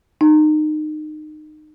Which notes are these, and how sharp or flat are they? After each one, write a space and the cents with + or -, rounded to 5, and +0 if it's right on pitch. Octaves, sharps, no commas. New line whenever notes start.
D#4 -25